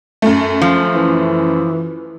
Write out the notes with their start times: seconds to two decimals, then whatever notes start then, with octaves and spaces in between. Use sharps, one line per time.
0.22 F#2 A3
0.62 F3
0.95 E3